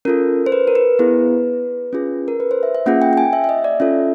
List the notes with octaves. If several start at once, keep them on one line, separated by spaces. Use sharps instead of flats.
C#4 F4 A4 A#4
C5
B4
A#4
B4
B3 E4 G#4 B4
C#4 F4 G#4
A#4
B4
C5
E5
E5
A#3 C#4 F4 G#4 F#5
G5
G5
G#5
E5
E5
D#5
D5
C#4 F4 A4 E5